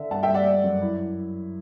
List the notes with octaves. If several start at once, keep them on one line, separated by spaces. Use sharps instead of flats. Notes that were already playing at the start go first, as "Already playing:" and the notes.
Already playing: D3 E5
G2 F#5 A5
E5 G5
G2
D5 F#5
A3
F#2
E4